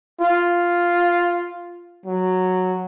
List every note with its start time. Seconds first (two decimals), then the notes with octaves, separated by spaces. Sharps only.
0.21 F4
2.06 F#3